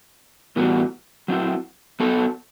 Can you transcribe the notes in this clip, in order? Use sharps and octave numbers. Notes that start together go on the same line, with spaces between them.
A2 E3 G3 B3 F#4
F#3 C4 E4
F#3 B3 F#4 A4